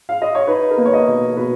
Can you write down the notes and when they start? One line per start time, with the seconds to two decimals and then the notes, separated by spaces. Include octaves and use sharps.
0.09 F5
0.22 D#5
0.35 C#5
0.47 D#4 B4
0.71 A#4
0.78 A#3 B4
0.86 C#5
0.93 D#5
1.08 B2
1.37 B2 B4